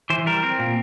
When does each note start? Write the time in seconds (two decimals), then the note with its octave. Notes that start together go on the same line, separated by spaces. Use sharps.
0.10 E3 C5
0.26 G3 A#4
0.43 C4
0.59 A#2